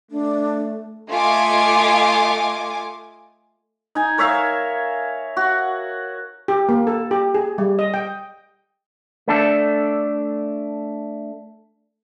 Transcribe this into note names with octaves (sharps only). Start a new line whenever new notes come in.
A3 D4
A3 F4 D#5 G#5 D6
D#4 G#5
A#4 C#5 E5 F5
F#4
G4
A#3
A4
G4
G#4
G3
D#5
G5
A3 D4 A4